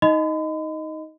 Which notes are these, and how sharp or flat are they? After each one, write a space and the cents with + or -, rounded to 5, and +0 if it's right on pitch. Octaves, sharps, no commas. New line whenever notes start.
D#4 +15 D#5 +0 B5 +40